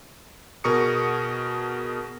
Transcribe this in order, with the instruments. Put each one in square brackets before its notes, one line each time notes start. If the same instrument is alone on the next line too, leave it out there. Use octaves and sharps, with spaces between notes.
[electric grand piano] B2 G#4 A#4 C#6 D#6 C#7